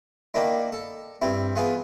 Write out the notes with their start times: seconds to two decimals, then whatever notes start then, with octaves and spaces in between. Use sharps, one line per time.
0.34 D#3 A#3 D4 E4
0.72 A4
1.22 G2 C4 E4
1.56 E3 B3 F4 G#4